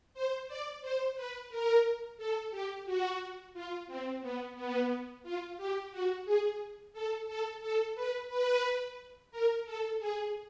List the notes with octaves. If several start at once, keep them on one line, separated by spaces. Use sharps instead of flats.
C5
D5
C5
B4
A#4
A4
G4
F#4
F4
C4
B3
B3
F4
G4
F#4
G#4
A4
A4
A4
B4
B4
A#4
A4
G#4